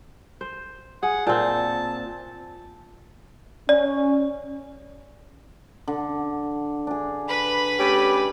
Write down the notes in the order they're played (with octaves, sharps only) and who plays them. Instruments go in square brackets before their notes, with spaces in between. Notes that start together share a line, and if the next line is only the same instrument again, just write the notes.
[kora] C5
[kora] G#4 [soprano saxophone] F#5
[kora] A#2 C4 [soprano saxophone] A5
[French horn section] C#4 [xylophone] D5
[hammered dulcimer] D3
D4 G#4
[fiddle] B4 B5
[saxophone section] A3 C#4 G4